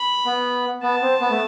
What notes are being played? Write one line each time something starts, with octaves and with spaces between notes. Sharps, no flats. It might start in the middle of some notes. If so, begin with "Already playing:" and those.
Already playing: B5
B3
B3 A5
C4
B3
A3